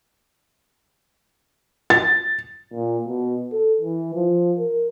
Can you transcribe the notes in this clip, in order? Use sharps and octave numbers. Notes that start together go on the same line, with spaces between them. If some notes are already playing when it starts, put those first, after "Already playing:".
A6
A#2
B2
A4
E3
F3
A#4